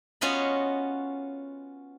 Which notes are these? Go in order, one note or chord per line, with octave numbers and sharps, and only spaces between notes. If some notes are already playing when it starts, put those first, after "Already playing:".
B3 C#4 F4 F#4 D#5 B5